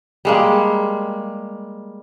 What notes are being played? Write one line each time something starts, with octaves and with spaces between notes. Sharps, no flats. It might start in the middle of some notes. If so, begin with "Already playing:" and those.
G3 G#3 A#3